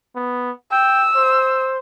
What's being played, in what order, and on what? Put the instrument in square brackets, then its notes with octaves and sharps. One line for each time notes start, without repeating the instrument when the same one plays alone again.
[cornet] B3
[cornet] G5 [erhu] E6
[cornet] C5